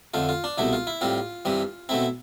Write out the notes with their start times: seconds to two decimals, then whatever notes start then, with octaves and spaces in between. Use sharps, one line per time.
0.14 F2 D3 A3 F4
0.29 F4
0.44 D4
0.58 C2 B2 A3 E4
0.73 F4
0.87 E4
1.01 A2 G3 C4 F4
1.45 G2 E3 G3 C4
1.89 B2 A3 C4 E4